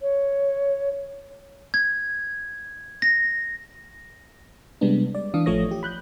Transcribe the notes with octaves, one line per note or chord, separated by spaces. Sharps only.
C#5
G#6
A#6
C3 G3 G#3 B3 D4
D5
E3 D4 F5 D#6
A1 F3 A3 C#5 D#6 A#6
G4
B5 F#6 G6